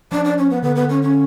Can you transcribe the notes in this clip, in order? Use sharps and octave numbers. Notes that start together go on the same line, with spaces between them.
F3 D4
D4
C#4
B3
D3 B3
B3
C#4
C#4